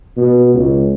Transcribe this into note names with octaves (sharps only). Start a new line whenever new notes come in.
B2
C#2